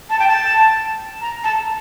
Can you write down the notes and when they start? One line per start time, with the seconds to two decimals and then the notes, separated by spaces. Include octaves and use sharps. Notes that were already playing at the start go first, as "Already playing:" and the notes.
0.10 A5
0.19 G5
0.28 A5
1.21 A#5
1.44 A5